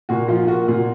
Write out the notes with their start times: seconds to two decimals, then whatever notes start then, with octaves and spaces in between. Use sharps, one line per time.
0.09 A#2 F#4
0.28 F3 F4
0.48 A#3 F#4
0.68 A#2